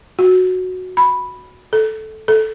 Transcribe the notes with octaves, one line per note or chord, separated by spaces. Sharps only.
F#4
B5
A4
A4